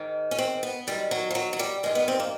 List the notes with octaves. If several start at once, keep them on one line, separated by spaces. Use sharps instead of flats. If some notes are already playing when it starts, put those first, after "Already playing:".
Already playing: G#2 D#3
C#4
C4
B3
F#2 D#3 G3
F#3
F3
F#3
F#3
G3
G2 D#3 G#3
B3
C4
A#3